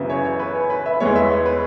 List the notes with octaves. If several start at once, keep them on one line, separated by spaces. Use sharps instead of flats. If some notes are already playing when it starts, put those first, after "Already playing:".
Already playing: F#2 C#3 E3 B3
C#5
C#5
B4
C#5
B4
E5
B4
E2 E3 G#3 B3 C#5
E5
C#5
B4